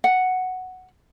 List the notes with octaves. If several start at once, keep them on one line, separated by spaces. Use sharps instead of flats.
F#5